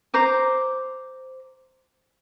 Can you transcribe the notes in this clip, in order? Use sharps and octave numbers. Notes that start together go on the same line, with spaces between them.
C5 A#5 D6